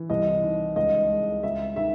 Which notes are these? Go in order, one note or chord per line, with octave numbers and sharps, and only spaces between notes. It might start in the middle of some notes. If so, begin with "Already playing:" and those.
Already playing: E3
C2 D#5
D#3
C#2 D#5
G#3
C#2 E5
D#3 E5